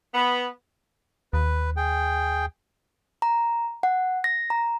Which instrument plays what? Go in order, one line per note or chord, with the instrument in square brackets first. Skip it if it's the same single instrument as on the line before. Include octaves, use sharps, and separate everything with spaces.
[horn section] B3
[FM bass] D#2 [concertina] B4
[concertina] G#4 G5
[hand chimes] A#5
F#5
A#6
A#5